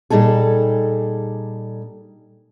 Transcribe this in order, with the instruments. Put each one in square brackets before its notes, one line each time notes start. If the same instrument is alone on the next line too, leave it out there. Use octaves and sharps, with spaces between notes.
[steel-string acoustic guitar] A#2 G3 D#4 G#4 A4